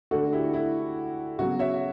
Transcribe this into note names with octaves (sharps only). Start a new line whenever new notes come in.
D3 A3 F#4 A4
E4 G4
E4
C#3 F#3 B3 F#4
C#5 E5